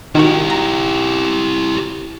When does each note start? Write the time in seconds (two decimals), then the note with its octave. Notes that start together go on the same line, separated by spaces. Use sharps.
0.15 D#3 D#4 E4 F#4 G4
0.50 A#5